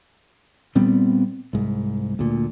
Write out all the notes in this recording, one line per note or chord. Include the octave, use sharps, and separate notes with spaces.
A#2 G3 B3 C4
C2 G#2
D2 A#2